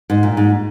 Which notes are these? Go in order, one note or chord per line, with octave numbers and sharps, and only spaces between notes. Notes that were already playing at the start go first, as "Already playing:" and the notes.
G#2
A#2
G#2